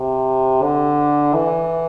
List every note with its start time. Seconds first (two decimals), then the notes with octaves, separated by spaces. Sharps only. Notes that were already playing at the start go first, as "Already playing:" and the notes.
Already playing: C3
0.63 D3
1.34 E3